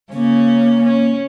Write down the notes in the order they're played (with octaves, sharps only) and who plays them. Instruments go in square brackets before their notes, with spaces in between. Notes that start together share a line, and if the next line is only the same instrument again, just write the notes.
[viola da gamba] C#3 C#4 [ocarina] A#3
[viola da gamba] C#4